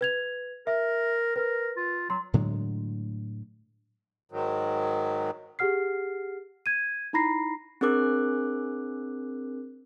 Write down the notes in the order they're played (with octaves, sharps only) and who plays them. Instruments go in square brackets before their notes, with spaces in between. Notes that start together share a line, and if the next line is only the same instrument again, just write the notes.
[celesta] B4 G#6 F7
[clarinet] A#4 [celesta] E5
[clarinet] A#4 [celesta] B4
[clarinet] F4
[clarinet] F#3 [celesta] C6
[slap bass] A2 D3 F#3 G#3
[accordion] G#2 D#3 F#3
[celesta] G4 G#4 F#5 F6 C7
G#6 D#7
D#4 E4 A#5 B5 A#6 C7
[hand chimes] C4 D4 G#4 A#4 D6 F#6